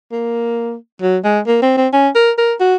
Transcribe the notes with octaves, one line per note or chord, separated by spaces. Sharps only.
A#3
F#3
G#3
A#3
C4
C4
C#4
A#4
A#4
F#4